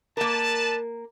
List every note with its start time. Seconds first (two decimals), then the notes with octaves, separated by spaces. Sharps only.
0.17 A#3 A#4 B4 D5 A5